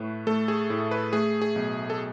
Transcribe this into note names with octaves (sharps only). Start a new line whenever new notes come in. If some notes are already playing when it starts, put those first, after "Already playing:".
Already playing: A2 A3 B4
A3 A4
G#4
A2
B4
A3 G#4
G#4
B1
A4